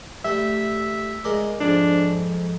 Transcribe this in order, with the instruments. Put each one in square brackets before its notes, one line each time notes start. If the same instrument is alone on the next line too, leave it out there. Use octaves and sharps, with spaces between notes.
[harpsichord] G3 A3 [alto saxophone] E5
[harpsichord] G#3 A#4 D5
[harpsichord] F2 G#2 [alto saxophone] D4